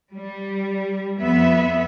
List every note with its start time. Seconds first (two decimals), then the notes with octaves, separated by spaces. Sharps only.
0.16 G3
1.20 F2 B3 E5